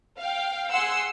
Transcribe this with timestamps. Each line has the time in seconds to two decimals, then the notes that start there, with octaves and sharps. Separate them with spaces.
0.19 F5 G5
0.71 G#4 F#5 C6 E6